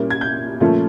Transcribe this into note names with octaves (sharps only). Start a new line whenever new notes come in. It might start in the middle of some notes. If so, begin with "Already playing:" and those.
Already playing: A#2 G3 A#3 C#4 E4
G#6
G6
A#2 F3 A3 C#4 F4